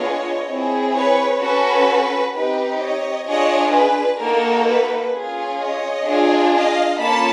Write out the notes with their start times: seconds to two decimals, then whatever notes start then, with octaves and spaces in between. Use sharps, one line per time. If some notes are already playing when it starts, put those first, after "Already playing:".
Already playing: B3 D4 F4 G#4 C#5 D#5
0.49 C4 E4 G#4
0.96 B4 C#5
1.42 C#4 F#4 A4 B4
2.34 C4 D#4 G4 B4
2.81 C#5 D#5
3.27 D4 F4 G#4 C#5 D#5
3.74 B4
4.21 A#3 D#4 F#4 A4 A#4
4.68 B4
5.13 C#4 F4 G#4
5.59 C#5 D#5
6.06 D4 F4 G#4
6.53 D#5 F5
6.99 A#3 C#4 F4 A4 A5 B5